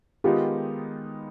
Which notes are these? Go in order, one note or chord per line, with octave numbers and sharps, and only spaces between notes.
D#3 G#3 B3 D#4 F4 G4